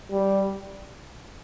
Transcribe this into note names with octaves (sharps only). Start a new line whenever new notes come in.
G3